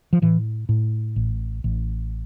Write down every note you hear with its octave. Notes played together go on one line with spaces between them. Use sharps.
F3
A2 E3
A2
A1
A1